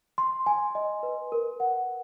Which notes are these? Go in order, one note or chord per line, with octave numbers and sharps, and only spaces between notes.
C6
G#5
D#5
B4
A#4
F#5